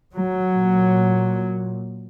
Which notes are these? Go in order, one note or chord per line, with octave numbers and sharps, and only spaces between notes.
F#3
A#2